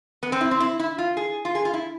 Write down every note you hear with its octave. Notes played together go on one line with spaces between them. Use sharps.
B3
C4
E4
C4
E4
E4
F4
G#4
F4
G#4
F4
E4